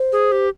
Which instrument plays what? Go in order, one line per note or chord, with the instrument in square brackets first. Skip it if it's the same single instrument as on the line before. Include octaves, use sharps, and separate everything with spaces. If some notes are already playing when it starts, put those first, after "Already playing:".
Already playing: [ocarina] C5
[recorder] G#4
G4